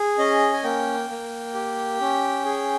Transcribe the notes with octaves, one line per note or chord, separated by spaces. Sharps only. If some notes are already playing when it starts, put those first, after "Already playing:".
Already playing: G#4
C#4 D#5
G#5
A#3 G5
A#3
G4
C#4
G#4